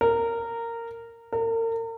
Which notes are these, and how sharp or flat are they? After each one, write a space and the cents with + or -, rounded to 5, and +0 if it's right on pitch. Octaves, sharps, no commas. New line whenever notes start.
A#4 -15
A#4 -40